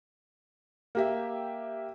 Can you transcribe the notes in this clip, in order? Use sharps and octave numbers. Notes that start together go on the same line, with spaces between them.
A#3 G4 E5